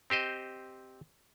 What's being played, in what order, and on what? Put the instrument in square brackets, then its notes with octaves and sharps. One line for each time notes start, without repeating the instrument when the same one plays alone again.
[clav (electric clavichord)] C4 G4 C5 D#5